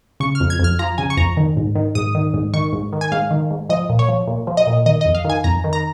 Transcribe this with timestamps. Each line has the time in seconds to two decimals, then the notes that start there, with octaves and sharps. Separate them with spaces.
0.20 C#3 C#6
0.35 F6
0.40 F2
0.50 G#6
0.59 F2 F6
0.79 F3 A#5
0.98 C#3 G#5
1.10 C#6
1.17 F2 A#5
1.37 D#3
1.56 G#2
1.75 D#3
1.95 G#2 D#6
2.15 D#3
2.34 G#2
2.54 D#3 C#6
2.73 G#2
2.93 D#3
3.01 G#5
3.12 G#2 F5
3.31 D#3
3.51 G#2
3.69 F3 D#5
3.89 A#2
3.99 C#5
4.09 F3
4.27 A#2
4.47 F3
4.57 D#5
4.67 A#2
4.86 D#3 D#5
5.01 D#5
5.05 F2
5.15 F5
5.25 D#3
5.30 G#5
5.44 F2 A#5
5.64 D#3
5.73 A#5